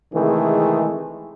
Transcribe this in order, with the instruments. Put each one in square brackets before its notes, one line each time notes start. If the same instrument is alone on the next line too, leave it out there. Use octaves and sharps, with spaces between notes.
[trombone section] C3 D#3 E3 G#3 A3 G#4